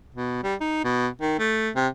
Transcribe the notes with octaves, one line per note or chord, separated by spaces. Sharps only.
B2
G3
D#4
B2
D#3
A3
C3